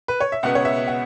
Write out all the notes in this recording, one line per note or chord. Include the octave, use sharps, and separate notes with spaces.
B4
C#5
E5
C#2 B2 B3 F#5
C#5
E5
F#5